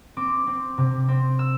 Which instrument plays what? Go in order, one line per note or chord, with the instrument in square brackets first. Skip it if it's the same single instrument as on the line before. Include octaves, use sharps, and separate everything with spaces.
[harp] C4 D6
C4
C3
C4
E6